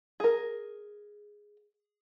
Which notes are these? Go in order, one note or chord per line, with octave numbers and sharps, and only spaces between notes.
G#4 A#4